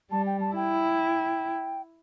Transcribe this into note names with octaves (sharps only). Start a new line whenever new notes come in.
G3 A5
G5
A5
E4 G5